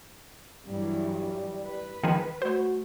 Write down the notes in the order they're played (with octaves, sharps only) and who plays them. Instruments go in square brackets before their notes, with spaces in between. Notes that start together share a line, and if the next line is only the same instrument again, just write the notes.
[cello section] G2 E3 F#3 [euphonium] G3
[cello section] B4
[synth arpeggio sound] D#3 F3 G#4
[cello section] A3 [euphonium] F#4 [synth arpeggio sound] C5